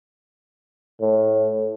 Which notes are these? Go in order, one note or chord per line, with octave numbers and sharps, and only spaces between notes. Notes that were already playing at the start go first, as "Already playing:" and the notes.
A2